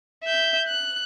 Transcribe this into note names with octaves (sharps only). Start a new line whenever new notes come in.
E5 G6
F#6